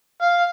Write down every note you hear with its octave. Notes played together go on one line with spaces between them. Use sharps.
F5